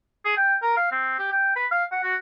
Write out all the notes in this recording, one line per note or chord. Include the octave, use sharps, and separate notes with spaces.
G#4
G5
A#4
F5
C4
G4
G5
B4
F5
F#5
F#4